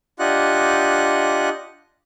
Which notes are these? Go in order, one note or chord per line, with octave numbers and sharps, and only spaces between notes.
D4 F4 G4 D#5 F#5 F#6